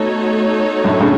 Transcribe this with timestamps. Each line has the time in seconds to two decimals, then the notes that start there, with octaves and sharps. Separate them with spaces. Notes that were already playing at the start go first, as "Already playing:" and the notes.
Already playing: B2 A3 D#4 F#4 A4 C#5
0.84 F#2 A2
1.00 A2 C#3